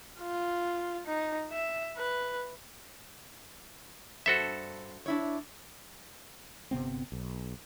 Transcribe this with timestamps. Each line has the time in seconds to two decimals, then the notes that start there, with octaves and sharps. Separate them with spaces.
0.19 F4
1.06 D#4
1.52 E5
1.97 B4
4.26 G2 F#4 A4 C5 E5
5.06 D4 E4 C#5
6.71 G1 C3 B3 C4
7.12 B1